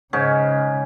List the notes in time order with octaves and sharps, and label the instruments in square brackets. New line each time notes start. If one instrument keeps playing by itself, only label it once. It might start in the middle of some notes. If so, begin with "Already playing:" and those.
[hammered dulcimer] G#2 C#4 [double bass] C#3